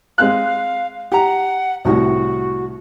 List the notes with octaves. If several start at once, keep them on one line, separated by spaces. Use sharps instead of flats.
G#3 C4 F5 F#6
G4 F#5 A#5
C2 A2 F#4